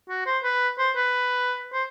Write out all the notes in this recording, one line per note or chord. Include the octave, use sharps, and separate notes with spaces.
F#4
C5
B4
C5
B4
C5